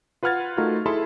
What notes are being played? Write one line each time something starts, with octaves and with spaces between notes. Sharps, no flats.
F4 B4 F#5 F6 G#6 A6
A3 D#4 F4 F#4 A#4
E4 G#4 A4 A5 B5 C6